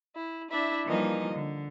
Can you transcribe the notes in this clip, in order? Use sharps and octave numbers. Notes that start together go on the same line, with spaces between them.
E4
D4 E4 E5
E3 F3 G3 A#3 D#4 D#5
D3